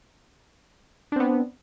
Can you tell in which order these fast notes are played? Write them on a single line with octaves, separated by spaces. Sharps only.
D4 C4 B3